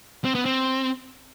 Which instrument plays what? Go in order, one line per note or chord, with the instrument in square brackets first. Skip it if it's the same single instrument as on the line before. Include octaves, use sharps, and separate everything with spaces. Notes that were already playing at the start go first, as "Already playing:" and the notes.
[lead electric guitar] C4
B3
C4